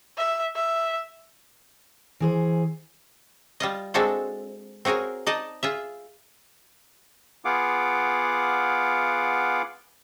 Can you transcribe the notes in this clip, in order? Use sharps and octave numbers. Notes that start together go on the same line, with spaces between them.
E5
E5
E3 G#4 C5
G3 F4 D#5
G#3 C4 D4 F#4 A4 C5
C4 F#4 G#4 A#4 C#5
D#4 D5 D#5 A5
F4 G#4 E5
B3 F4 G#4 F5 F#5 D6